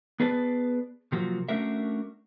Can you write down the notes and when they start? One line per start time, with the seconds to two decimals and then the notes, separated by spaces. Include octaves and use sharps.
0.20 B3 G#4 B4 D5 A5
1.12 C3 F3 F#3 A#3 F4 F#4
1.49 A3 C#4 D4 F#4 A#4 E5